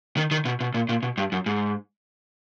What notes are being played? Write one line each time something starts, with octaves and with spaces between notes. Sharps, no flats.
D#3
D#3
B2
B2
A#2
A#2
B2
G2
F#2
G#2